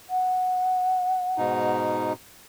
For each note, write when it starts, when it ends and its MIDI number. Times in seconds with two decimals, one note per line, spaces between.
0.10 1.74 78
1.38 2.13 44
1.38 2.13 47
1.38 2.13 63